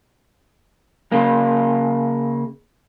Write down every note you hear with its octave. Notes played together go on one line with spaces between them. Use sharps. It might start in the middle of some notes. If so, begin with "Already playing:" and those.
C#3 A#3